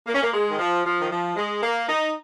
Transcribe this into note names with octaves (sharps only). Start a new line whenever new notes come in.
A#3
C#4
A#3
G#3
D#3
F3
F3
D#3
F3
G#3
A#3
D#4